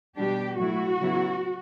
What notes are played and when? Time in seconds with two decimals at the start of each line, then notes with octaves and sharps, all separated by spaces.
0.16 B2 G3 D4 G4
0.58 A2 F#3 A3 E4 F#4
0.99 C#3 F#3 B3 E4